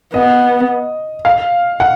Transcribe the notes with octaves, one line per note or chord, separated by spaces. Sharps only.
B3 D#5
F5
F#5